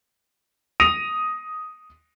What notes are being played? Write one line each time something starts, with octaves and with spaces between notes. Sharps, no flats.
D#6 A#6 D#7 F7